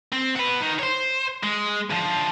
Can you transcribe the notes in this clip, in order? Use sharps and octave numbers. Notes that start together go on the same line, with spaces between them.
C4
F#4 B4
D#3
C5 C#5
G#3
D2 F3